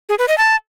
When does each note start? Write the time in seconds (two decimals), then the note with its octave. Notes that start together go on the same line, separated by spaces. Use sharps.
0.09 G#4
0.19 B4
0.28 D#5
0.38 A5